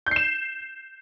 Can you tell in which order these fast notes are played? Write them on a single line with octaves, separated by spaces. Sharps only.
G6 C7 E7